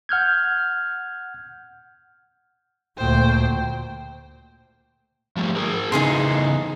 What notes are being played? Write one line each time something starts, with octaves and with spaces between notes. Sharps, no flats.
F#5 F6 G6 G#6
D2 A#2 C5 G5
F3 G3 A3
G#4 A#4
C#3 E3 B3 D#4 G#4 C6